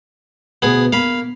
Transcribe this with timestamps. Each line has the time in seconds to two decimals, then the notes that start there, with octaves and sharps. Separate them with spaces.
0.62 D2 B2 B3 G#4
0.93 A#3 F5 B5